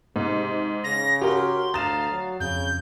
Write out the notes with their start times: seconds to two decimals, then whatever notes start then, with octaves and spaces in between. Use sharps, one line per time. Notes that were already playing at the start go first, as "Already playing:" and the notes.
0.16 G#2 C3
0.84 C#3 A#6
1.22 F#4 G4 A#4 C#5 C6
1.74 D2 F5 A#5 D#6 A6 E7
2.11 F#3
2.40 F2 C#3 G6